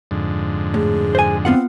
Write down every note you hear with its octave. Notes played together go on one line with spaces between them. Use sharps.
F2 G#2 D3
A2 G#4
C5 G#5
B3 C4 F4 F#5